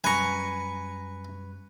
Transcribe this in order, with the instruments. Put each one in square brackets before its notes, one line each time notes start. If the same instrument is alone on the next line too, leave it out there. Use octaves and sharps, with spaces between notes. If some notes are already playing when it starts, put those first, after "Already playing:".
[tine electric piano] F#2 G3 [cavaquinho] B4 A#5 [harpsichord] G#5 C#6